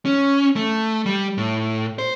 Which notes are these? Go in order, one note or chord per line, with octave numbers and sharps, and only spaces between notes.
C#4
A3
G3
A2
C5